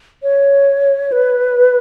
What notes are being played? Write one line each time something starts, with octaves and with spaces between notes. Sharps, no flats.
C#5
B4